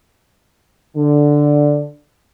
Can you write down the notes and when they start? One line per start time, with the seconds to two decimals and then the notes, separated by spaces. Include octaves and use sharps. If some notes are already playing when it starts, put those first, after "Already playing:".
0.97 D3